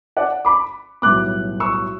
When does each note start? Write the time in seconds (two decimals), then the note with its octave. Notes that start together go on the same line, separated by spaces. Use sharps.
0.17 D5 F#5
0.45 B5 D6
1.02 B1 A2 G3 B3 D6 F#6
1.60 C#6 E6